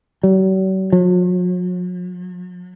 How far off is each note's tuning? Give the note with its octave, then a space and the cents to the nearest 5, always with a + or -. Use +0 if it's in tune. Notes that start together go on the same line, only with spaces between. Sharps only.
F#3 +45
F#3 -45